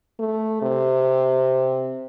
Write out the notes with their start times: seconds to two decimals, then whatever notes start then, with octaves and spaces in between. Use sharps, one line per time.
0.19 A3
0.62 C3